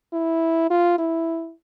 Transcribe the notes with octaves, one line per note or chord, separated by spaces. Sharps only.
E4
F4
E4